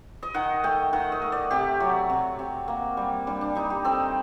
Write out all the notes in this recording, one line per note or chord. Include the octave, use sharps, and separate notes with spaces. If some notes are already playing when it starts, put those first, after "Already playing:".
D#5
D#3 F#5
A3 G5
D#3 F#5
D#5
A3
D5
C3 G4
F#3 F#4
C3
C3
A#3
G3
G3 D4
D4
G3 D#4
G4
C4 A4